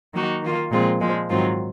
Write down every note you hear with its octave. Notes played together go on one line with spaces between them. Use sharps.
D#3 F#3 A#3 D#4 F#4
D#3 A#3 F4
A#2 F3 G#3 C4 F4
A#2 F3 G#3
G#2 D#3 F#3 C4 F4